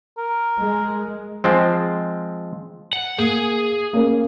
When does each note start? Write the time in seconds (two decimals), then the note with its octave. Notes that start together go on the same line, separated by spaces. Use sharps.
0.18 A#4
0.58 G#3
1.44 F3 G#3 C4
2.93 F#5
3.18 A#3 G#4
3.93 A#3 C#4 A#4